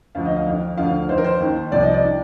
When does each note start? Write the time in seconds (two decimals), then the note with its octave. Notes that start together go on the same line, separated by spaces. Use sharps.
0.15 D2 D3 F3 F5
0.26 D#5
0.36 F5
0.46 F2 D#3
0.77 D2 D3 F3 F5
1.09 F2 D#3 C5
1.18 A#4
1.24 C5
1.40 D#2 D#3
1.72 C2 C3 F3 D5
1.83 D#5
1.94 D5
2.04 D#3